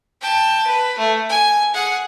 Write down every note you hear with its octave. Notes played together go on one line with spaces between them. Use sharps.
G5 A5
B4
A3
G#5
G#4 F#5